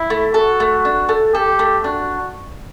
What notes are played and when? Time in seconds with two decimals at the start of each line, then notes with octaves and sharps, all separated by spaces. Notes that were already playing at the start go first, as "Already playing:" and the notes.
Already playing: E4
0.10 A3
0.34 F#4 A4
0.60 A3
0.85 D4
1.09 A3
1.34 G4 A4
1.59 A3
1.84 D4 F#4